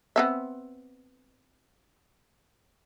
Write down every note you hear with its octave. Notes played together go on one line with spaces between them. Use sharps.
B3 C4 E5